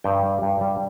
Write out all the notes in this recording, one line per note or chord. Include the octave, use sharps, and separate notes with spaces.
G2 G5
G3
G2
G3